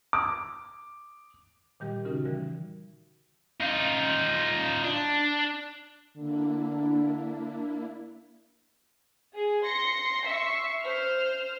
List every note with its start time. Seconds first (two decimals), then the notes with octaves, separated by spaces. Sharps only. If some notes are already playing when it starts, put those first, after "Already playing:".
0.13 D6
1.80 A#2 D#3 G3 G4
2.05 C#3 C#4 D#4 F#4 A#4
2.25 D3 E3 G3
3.61 D#4 F4
4.84 D4
6.17 D3 A#3 D4 E4
9.35 G#4
9.64 C6 A#6 C#7
10.25 E5 C#6 C7
10.82 C5 F6